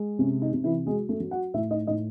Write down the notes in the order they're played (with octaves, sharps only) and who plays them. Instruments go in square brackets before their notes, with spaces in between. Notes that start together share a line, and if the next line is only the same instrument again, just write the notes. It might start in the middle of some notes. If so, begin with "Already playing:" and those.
Already playing: [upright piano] G#3
C3 C#4
D#4
C3
E3 E4
F#3 G#3 G#4
A3 A4
F#3
F#4 F#5
A2 E4 E5
D#4 D#5
A2 D#4 D#5